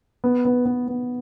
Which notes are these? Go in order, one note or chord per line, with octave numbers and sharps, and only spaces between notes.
B3
B3
B3
B3